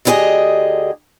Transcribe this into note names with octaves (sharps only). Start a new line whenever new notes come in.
D2 D3 E4 G4 G#4 D#5